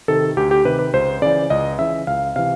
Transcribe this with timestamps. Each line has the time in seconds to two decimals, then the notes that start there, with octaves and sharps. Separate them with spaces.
0.08 C3 D#3 A4
0.37 D2 G4
0.51 G4
0.65 C3 D#3 B4
0.79 B4
0.93 C#2 C5
1.22 C#3 E3 D5
1.50 C#2 D#5
1.79 C#3 E3 E5
2.07 C#2 F5
2.36 C3 E3 F5